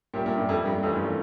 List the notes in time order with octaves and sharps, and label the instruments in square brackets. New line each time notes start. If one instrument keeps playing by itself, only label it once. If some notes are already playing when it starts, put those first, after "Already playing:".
[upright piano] A#2 [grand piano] G3 C#4 G4 A#4 E5
[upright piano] A#2
G2
F2
G2
[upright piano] F2 [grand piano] E3 A3 C#4 F4 A#4
[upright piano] G2